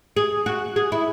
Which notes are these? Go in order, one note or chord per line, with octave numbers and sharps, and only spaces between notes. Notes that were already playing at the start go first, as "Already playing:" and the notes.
G#4
F#4
G#4
E4